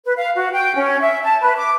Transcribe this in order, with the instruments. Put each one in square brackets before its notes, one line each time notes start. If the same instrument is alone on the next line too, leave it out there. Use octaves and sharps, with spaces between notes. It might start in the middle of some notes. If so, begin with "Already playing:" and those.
[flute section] B4
F5
F#4
G5
C#4
E5
A5
B4
D6